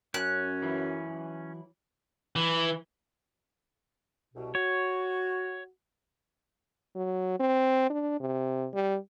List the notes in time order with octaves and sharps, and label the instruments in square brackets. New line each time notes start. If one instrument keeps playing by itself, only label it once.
[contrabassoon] F#2 [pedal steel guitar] C#4 [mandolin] F#6
[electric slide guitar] E3 F#3 E4
[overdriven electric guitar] E3
[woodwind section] C2 B2
[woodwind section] F#4 [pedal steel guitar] C#5
[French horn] F#3
C4
D4
C3
G3